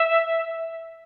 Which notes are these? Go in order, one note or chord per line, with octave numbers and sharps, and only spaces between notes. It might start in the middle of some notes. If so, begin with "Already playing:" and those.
Already playing: E5